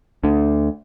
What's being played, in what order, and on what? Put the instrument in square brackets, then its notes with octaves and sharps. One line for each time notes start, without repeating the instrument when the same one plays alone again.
[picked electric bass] D2 D3